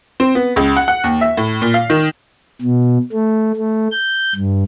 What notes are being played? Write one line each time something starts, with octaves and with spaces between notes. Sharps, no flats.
C4
B3
C#2
F#5
F#5
D#2
E5
A2
A#2
F5
D#3
B2
A3
A3
G6
G2